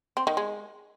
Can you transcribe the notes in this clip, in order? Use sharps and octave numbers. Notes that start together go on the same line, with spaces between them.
C4
D#3
G#3